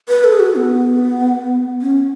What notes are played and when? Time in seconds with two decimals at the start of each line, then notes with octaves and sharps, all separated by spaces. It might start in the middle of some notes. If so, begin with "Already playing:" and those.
0.08 B4
0.24 A4
0.32 G#4
0.40 F#4
0.55 B3
1.81 C#4